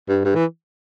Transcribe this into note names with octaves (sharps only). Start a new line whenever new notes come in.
G2
G2
E3